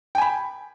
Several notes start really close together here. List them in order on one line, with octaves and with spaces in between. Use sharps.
G5 G#5 B5